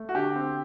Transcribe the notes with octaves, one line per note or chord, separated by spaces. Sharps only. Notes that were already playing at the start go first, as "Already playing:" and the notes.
Already playing: A3
F#4
D3 G4
C4